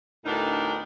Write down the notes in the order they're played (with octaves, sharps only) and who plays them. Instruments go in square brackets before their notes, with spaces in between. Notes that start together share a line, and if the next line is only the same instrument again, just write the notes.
[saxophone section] D2 A2 B3 D4 D#4 A#4